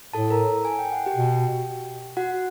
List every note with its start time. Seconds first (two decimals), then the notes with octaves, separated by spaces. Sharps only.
0.13 A2 A4 A5
0.30 A#4 A#5
0.65 G#5
0.79 G5
0.92 F#5
1.06 G4 G5
1.15 B2
2.17 F#4 F#5